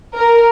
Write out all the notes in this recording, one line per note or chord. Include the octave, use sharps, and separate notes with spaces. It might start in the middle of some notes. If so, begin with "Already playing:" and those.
A#4